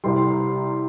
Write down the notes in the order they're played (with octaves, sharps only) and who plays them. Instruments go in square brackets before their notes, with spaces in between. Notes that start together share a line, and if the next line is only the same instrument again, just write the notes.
[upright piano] C2 C3 G3 C6